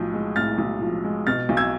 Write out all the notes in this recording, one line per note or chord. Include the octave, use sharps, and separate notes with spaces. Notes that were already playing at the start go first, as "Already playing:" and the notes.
Already playing: B1 A2 F3
G#3
A2 F6 A6
B1
F3
G#3
B2 F6 A6
B1
E6 G#6